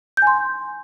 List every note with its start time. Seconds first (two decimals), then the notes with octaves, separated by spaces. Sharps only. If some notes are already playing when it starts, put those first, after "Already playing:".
0.17 G6
0.22 G#5
0.27 C6